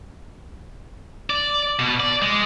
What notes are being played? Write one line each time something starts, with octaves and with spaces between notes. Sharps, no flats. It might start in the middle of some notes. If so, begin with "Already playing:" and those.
D5
B2
D5
G#3